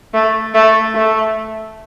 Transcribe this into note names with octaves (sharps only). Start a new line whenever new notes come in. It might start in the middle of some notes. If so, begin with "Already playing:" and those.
A3
A3
A3